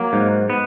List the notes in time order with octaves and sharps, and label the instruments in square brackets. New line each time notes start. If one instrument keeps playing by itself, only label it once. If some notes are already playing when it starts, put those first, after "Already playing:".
Already playing: [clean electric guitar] F#3 A#3
G#2
B3